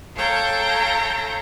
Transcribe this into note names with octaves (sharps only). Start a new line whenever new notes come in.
A4 C#5 F5 G5 A5 A#5